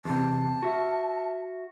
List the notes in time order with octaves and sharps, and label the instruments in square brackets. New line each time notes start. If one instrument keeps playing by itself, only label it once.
[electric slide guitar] E2 C3 [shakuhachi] A5
[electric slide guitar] F#4 E5